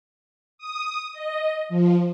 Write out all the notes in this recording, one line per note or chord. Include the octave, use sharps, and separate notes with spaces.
D#6
D#5
F3